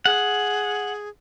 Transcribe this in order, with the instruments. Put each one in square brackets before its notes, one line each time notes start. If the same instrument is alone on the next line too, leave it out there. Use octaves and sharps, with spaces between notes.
[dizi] G#4 [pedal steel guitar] F#5